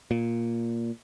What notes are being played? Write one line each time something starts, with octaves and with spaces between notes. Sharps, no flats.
A#2